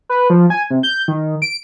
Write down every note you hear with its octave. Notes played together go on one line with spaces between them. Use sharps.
B4
F3
G#5
C3
G6
D#3
D7